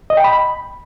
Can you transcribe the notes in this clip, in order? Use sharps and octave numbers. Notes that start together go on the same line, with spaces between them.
D#5
G5
B5